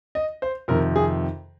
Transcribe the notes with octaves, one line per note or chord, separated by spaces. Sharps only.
D#5
C5
F2 C3 D#3 A#4
G#4